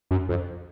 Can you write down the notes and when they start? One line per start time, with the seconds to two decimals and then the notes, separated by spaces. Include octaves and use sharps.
0.11 F#2
0.29 F2